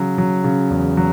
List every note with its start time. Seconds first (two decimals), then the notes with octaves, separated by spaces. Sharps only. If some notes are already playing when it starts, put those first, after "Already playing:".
Already playing: C#3 F#3
0.18 F#3
0.44 C#3
0.70 E2
0.97 F#3